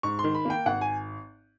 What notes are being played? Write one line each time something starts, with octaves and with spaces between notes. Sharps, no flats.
G#2 C#6
C6
D#3
B5
A#3 G5
G#1 F#5
G#5